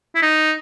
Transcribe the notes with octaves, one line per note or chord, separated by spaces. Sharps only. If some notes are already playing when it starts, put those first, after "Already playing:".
E4
D#4